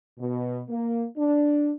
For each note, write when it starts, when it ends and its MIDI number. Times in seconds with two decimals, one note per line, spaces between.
0.19 0.60 47
0.69 1.05 58
1.17 1.71 62